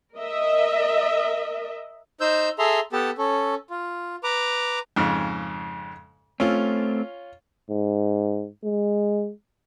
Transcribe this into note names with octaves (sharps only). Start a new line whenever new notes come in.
A#4 D#5 E5
D#4 C5 E6 G6
G#4 A4 E5 A#5 C6
B3 G4 A4 A5
C#4 A4
F4
B4 A#5 D6
F2 G#2 C#3
A3 C4 C#4 F4
G#2
G#3